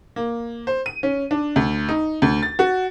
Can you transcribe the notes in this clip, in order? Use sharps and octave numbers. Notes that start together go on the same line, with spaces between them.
A#3
C5
D#7
C#4
D4
D2
D#4
D2
A6
F#4